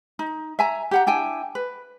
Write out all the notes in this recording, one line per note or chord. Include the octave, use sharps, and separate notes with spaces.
D#4
E5 G#5 A#5
G4 F#5 A#5
D4 E4 G5 G#5
B4